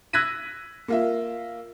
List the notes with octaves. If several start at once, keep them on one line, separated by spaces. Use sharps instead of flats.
E6 F#6 G#6 A#6 B6 D#7
A#3 F4 E5